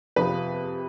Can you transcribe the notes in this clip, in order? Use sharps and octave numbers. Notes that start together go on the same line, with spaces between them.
F2 C3 F3 B4